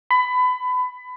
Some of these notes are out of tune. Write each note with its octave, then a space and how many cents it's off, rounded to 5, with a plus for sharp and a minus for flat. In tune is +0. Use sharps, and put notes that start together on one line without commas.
B5 +25